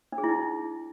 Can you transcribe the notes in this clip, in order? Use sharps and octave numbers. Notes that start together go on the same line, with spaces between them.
D4
G#4
E4
D#4